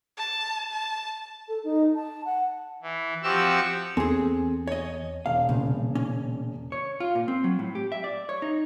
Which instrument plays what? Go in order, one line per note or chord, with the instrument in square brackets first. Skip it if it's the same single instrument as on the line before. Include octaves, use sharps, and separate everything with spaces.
[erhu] A5
A5
[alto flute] A4
D#4
A5
F#5
[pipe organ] E3
F3 C4 F#4 G4 C#6 E6
[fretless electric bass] E2 [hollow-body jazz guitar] C4 G#4 [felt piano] A4 G#5
[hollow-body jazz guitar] C#5 D#5
[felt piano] E1 [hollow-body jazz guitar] F5
[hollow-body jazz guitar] C2 [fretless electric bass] A#2 C#3
[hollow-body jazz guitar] C#4
C#5
F4
A#2
C4
F#3
A2
G4
E5
D5
C#5
D#4